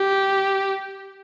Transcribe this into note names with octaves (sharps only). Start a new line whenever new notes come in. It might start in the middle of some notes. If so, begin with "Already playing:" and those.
Already playing: G4